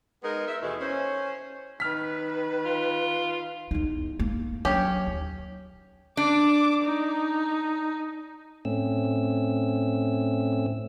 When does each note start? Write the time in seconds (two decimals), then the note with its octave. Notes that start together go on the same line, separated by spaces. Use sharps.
0.23 G#3 B3 D#4 G#4 A#4
0.48 E5
0.61 D#2 B2 E3 A3 D#4 G#4
0.81 C#4 C5
1.80 D#3 B4 F6 B6
2.65 F4
3.71 E2 D#4
4.20 A#3
4.65 F#3 C#4 G4
5.07 D#2
6.17 D4 D6
6.84 D#4
8.65 A2 A3 C4 C#4 E6